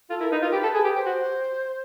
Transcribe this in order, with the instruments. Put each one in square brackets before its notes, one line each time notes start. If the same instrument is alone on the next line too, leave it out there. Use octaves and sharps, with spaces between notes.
[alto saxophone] F4 [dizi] A4
[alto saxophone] E4 [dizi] A#4
[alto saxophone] D#4 [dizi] B4
[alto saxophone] F4 [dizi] A#4
[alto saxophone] G4 [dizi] B4
[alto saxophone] A4
G#4
G4
[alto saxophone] G4 [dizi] C5
[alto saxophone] F#4